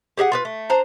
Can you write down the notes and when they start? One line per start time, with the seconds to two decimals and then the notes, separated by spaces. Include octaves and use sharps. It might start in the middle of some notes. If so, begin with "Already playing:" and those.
0.17 G4 G#4 D#5 F#5
0.32 F4 G#4 B4
0.45 A3
0.70 D4 C5 A#5